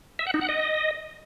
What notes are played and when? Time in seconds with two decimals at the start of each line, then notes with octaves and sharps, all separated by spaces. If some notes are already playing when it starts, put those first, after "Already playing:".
0.19 E5
0.27 F#5
0.34 D#4
0.41 F#5
0.49 D#5